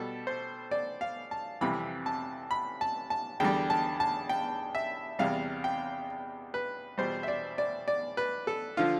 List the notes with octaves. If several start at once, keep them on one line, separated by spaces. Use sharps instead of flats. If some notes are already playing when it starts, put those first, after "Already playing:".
Already playing: B2 G3 A4
C5
D5
F5
A5
F2 C3 E3 G3 B5
A5
B5
A5
A5
E2 D3 G3 G5
A5
A5
G5
E5
E2 C3 G3 F5
G5
B4
E2 B2 G3 C5
E5
D5
D5
D5
B4
A4
D3 F3 F4